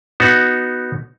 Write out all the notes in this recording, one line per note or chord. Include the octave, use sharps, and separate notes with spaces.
B3 D#4 F#4